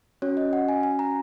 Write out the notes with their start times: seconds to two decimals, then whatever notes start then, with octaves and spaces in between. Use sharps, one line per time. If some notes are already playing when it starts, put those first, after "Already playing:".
0.22 C#4 F#4 C#5
0.37 D#5
0.53 F#5
0.68 G#5
0.83 G#5
0.99 A#5